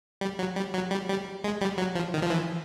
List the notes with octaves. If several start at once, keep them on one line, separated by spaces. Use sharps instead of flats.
G3
F#3
G3
F#3
G3
G3
G#3
G3
F#3
F3
D#3
F3
E3